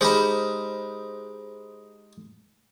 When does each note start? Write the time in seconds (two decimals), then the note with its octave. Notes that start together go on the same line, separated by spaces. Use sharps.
0.01 G#3 D#4 G4 C5 B5